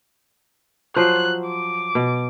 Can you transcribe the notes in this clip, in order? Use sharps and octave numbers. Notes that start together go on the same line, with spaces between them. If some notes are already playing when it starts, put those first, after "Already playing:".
F3 F#3 C5 F#6
D6
B2